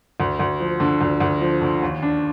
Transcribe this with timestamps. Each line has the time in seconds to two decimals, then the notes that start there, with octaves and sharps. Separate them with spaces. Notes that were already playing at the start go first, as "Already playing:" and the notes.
0.20 D2
0.39 D2
0.60 F3
0.80 D3
1.01 D2
1.20 D2
1.41 F3
1.62 D3
1.82 D#2
2.03 D4